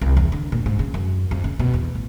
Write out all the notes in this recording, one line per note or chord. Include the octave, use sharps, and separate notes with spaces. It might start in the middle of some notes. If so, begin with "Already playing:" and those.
C2
E2
D3
A#2
G#2
C#3
F#2
F2
C#3
B2
E2
A1